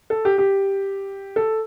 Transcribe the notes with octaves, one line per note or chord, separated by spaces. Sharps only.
A4
G4
G4
A4